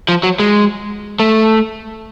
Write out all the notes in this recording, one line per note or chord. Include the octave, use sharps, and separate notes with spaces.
F3
F#3
G#3
A3